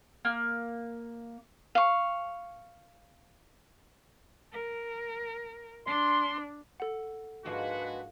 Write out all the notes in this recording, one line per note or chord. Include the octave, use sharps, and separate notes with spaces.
A#3
F5 C#6
A#4
D4 C6
A4 F#5
G#2 F3 G#3 A#3 D4 F#4 B4